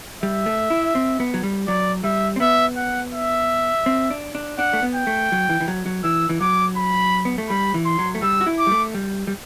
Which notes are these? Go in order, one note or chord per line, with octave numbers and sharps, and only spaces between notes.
G3 E5
A3
E4
C4
B3
F#3
G3
F#3 D5
G3 E5
C4
B3 E5
F#5
E5
C4
D4
D4
D4 F#5
A3
B3
G5
A3
F#3
E3
E3
F#3
F#3
E3 E6
E3
F#3 D6
B5
B3
A3
G3 B5
E3
C6
F#3
A3
G3 E6
F#4
E4
D6
G3
A3
G3
G3